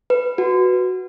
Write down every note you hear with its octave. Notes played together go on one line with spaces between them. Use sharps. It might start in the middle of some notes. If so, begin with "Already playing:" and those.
B4
F#4